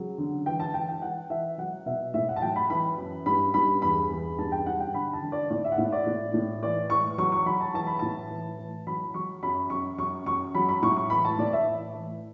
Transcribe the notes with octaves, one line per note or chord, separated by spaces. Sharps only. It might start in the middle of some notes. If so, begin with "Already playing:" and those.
Already playing: C#3 F#3
D3
E3 G5
A5
E3 G5
G5
E3 F#5
E3 E5
F#3 F#5
B2 E5
A2 E5
F#5
A5
F#3 G5
B5
E3 B5
F#2
G2 B5
G2 B5
E2 B5
E2
G2 A5
G5
G2 F#5
G5
D3 B5
A5
D3
D5
A2 D5
E5
F#5
A2 E5
D5
A2
A2
E3 D5
E3 C#6
F#3 C#6
C#6
F#3 B5
A5
E3 A5
B5
A2 A5
E3
E3
F#3 B5
F#3 C#6
F#2 B5
F#2 C#6
F#2 C#6
F#2 C#6
F#3 B5
B5
A2 C#6
C#6
E3 B5
A5
A2 D5
E5
E3
E3